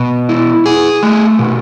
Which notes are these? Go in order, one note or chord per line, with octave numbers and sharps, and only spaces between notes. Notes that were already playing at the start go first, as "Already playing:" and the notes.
Already playing: B2
E4
G#4
A3
B2